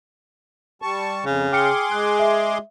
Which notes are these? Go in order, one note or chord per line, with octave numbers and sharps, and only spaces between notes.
G3 A5 C#6
F2 C#3
G#4 G5 C6 D6 F6 C#7
G#3 F#6
E5